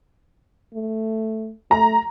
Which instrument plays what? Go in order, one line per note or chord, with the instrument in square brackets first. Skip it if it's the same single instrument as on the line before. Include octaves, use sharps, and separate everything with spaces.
[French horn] A3
[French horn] A3 [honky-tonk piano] A#5